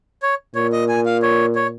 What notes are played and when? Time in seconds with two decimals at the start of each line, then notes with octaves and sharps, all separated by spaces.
0.23 C#5
0.55 A#2 C#5
0.73 D#5
0.89 G#5
1.06 F5
1.22 C#5
1.56 C#5